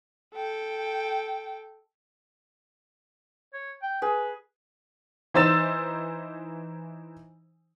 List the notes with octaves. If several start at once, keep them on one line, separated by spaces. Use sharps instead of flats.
A4 G5
C#5
G5
G#4 B4
E3 D#4 C5 E6 A6 E7